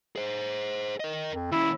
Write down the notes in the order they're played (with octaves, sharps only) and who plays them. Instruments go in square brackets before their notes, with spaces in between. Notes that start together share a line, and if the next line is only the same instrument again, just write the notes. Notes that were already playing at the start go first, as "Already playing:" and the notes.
[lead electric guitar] G#4 C5
A#4 D#5
[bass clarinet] F2
[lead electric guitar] D#2 C#4 [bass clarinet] E4